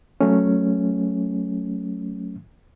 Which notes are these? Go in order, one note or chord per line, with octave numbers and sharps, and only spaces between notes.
F#3 A3 C#4